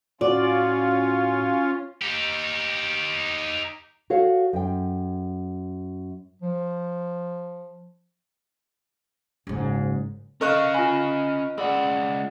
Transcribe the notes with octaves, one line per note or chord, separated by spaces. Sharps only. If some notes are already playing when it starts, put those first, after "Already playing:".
A2 C#4 F4 F#4 D5
D#4 G4
F#4 A4 C#5 F5
F#2 G5
F3
F#1 G#2
C#4 A4 A#4 D#5 F5 C#6 F#6
F4 G#5 B5
C#2 G#4 D5 F#5 B5 E6